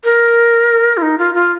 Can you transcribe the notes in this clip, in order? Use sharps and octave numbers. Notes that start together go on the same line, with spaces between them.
A#4
F4
D#4
F4
F4